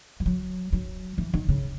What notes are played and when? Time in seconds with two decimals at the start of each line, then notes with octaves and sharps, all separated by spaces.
0.20 F3
0.26 F#3
0.73 F#3
1.18 E3
1.34 D#3
1.49 C#3